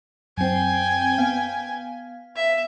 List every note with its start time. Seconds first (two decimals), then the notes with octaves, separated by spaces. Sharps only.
0.38 F#2 C4 G5 G#5
1.18 B3 F5
2.36 E5